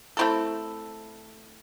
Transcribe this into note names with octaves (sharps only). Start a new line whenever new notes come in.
A3 C4 E4 A4